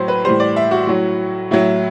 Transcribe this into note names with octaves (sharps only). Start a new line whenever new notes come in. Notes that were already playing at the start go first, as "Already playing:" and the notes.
Already playing: A2 F#3 C5
B4
A2 E3 G3 C5
D5
E5
F#4
A2 F#3
A2 F#3 E4